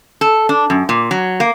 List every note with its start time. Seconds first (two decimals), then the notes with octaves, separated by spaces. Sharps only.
0.21 A4
0.49 D4
0.70 F#2
0.89 A#2
1.11 F#3
1.40 A#3